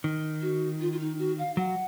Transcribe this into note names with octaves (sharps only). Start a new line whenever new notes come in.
D#3
F#4
F4
F4
D#4
F#4
F5
F#3 F#5